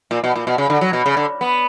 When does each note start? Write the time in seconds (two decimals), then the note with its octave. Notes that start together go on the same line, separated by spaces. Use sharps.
0.11 A#2
0.24 B2
0.36 A#2
0.47 B2
0.58 C#3
0.70 D3
0.81 F#3
0.93 B2
1.06 C#3
1.17 D3
1.41 B3